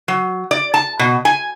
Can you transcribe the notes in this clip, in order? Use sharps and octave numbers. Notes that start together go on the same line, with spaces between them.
F#3
D5
A5
B2
G#5